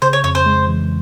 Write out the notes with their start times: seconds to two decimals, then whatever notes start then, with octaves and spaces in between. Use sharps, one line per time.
0.02 C#3 C5
0.13 C#5
0.24 F2 C#5
0.35 C5
0.46 G#3
0.68 E3